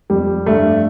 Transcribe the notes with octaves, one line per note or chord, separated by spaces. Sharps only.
F2 G3
G2 A3